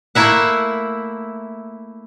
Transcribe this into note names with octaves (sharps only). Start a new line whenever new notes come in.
A3 A#3 E4 E5 F#5